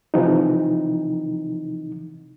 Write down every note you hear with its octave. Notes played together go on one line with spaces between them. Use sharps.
C3 E3 F3 D#4